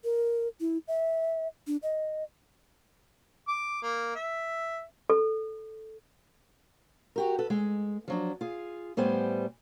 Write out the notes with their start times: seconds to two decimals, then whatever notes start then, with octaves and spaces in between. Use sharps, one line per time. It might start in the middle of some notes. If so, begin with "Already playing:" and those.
0.04 A#4
0.61 E4
0.88 E5
1.67 D4
1.83 D#5
3.48 D6
3.82 A#3
4.15 E5
5.10 A4
7.16 F#4 G4 A#4
7.39 A4 B4
7.50 G#3
8.08 F3 F#3 D4
8.41 F4 G#4
8.97 A2 G3 B3 C5 G#5